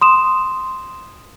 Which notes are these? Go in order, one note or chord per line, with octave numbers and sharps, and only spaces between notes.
C6 D#6 E7